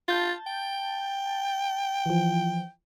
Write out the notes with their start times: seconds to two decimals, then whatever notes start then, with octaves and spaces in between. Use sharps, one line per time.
0.08 F4 A5 G6 A6
0.47 G5
2.06 E3 F3